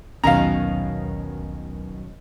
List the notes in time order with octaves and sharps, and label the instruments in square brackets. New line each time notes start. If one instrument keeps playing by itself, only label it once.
[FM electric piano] A#1 D#2 F#3 [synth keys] B2 D#3 C#4 [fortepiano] F5 A#5